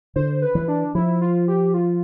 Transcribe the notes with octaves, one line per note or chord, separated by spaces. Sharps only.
D3 C5
B4
E3
D4
F3 E4
F4
G4
F4